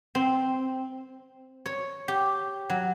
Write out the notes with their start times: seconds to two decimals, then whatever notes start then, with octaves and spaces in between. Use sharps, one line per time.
0.15 C4
1.66 C#5
2.08 G4
2.70 F#3